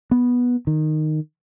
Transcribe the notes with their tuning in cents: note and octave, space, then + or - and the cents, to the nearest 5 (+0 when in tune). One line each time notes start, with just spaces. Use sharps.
B3 -10
D#3 -10